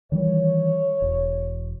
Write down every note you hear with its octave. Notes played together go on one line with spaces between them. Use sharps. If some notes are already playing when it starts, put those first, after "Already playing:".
D#3 E3 G3 C#5
E1